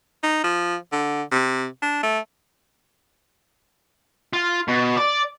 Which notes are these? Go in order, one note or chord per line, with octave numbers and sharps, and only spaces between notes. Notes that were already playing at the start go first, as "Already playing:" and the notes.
D#4
F3
D3
C3
D4
A3
F4
B2
D5